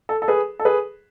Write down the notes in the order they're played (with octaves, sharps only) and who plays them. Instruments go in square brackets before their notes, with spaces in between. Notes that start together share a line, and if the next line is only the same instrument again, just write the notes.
[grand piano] A4
A4
G#4 B4
A4
G#4 B4